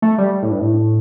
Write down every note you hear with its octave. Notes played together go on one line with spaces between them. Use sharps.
A3
G3
A2
G2
A2